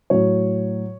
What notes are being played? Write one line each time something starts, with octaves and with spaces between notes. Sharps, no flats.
A2 F#3 C#5